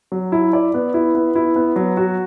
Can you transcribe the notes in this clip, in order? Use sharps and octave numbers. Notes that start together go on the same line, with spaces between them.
F#3
E4
D5
B3
E4
B3
E4
B3
F#3
F#4